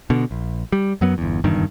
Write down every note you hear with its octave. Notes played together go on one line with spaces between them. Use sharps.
B2 D3
A#1
G3
F#2 F#3 B3
G1 E2
F#1 E2 G2 D#3